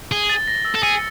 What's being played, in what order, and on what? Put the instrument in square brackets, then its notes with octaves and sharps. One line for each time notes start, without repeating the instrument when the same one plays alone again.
[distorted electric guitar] G#4 [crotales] G7
[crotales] A6
A#6
E6
[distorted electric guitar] A4
[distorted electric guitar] G#4 [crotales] C#7